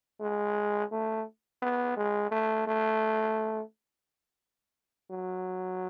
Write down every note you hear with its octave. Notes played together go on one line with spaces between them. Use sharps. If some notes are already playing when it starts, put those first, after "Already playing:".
G#3
A3
B3
G#3
A3
A3
F#3